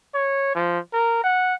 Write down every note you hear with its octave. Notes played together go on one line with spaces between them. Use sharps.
C#5
F3
A#4
F#5